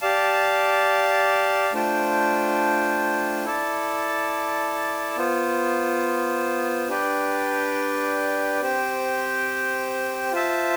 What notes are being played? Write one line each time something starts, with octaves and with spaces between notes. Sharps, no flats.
G4 D5 F5 A5
A3 D4 F4 C5 G5
E4 A4 D5 A5
B3 F4 C5
D4 G4 B4 D5 G5
C4 G4 C5 G5
F4 C5 E5 A5